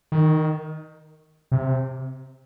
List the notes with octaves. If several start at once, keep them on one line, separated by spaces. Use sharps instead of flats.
D#3
C3